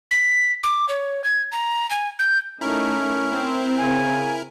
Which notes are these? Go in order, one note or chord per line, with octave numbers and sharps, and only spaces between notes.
B6
D6
C#5
G#6
A#5
G#5
G6
A3 C#4 D#4 E4 A#4
C4
C#3 G#5